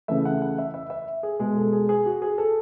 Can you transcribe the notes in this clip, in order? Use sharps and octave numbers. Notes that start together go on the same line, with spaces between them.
C#3 E3 A3 E5
F#5
F#5
E5
E5
E5
G#4
B2 G#3 G#4
A4
G#4
G#4
F#4
G#4
A4